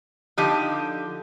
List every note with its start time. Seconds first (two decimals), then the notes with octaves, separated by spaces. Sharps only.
0.37 D3 F3 D#4 G4